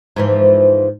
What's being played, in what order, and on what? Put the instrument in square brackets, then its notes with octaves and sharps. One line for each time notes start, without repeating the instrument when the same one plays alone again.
[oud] G#2 E3 F3